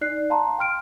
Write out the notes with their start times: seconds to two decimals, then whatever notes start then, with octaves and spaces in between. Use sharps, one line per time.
0.01 D#4 D5 F#6 C7
0.30 F5 A5 A#5 C6
0.58 G5 C6 F6 D7